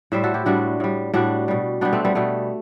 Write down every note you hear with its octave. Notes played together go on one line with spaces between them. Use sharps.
A2 G3 C5 E5
F#4 A4
E4 G4
A2 G3 D4 F#4
A2 G3
A2 G3 D4 F#4
B2 G3
B2 G3 B3 D4
A3 C4
G3 B3
B2 G3 A3